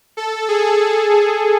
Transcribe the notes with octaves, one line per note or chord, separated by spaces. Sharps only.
A4
G#4
A4
G#4